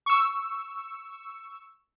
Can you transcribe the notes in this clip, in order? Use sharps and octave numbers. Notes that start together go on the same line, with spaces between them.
C#6 E6